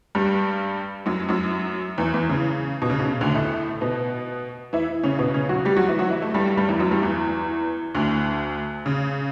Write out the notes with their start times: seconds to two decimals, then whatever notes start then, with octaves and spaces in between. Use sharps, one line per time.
0.15 G2 G3
1.06 F#2 F#3
1.29 F#2 F#3
1.98 E2 E3
2.14 E2 E3
2.29 C#3
2.82 B2
2.90 C#3
2.99 B2
3.05 C#3
3.21 D2 D3
3.35 A2 A3
3.81 B2 B3
4.73 E3 E4
5.03 C#3 C#4
5.19 B2 B3
5.34 C#3 C#4
5.49 F#3 F#4
5.65 G3 G4
5.77 F#3 F#4
5.89 E3 E4
5.99 F#3 F#4
6.10 E3 E4
6.22 A3
6.34 G2 G3
6.57 G2 G3
6.69 E2 E3
6.80 F#2 F#3
6.91 G2 G3
7.02 E2 E3
7.95 D2 D3
8.86 C#3